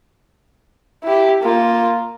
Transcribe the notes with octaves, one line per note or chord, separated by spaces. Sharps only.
E4 G4
A#3 F4